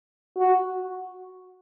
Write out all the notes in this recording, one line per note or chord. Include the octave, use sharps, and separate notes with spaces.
F#4